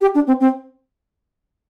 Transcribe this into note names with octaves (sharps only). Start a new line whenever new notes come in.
G4
D4
C4
C4